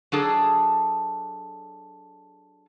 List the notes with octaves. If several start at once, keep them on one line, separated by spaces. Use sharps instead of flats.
F#3 D4 G#4 A4